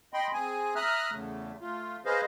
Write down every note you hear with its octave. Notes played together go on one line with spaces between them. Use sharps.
D#5 G5 B5 C6
C4 G#4 G#5
E5 A#5 D#6 F6 F#6
E2 C#3 A3
A3 F4
G#4 B4 C5 D#5 F5